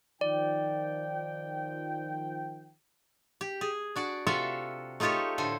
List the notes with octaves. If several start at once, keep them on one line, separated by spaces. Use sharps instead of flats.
D#3 F3 D5 G5
G4
G#4
D4 F#4 D5
C3 F4 F#4 A4 E5 F5
A3 D#4 F4 G4 A4 C#5
A2 D3 A4 C5 G#5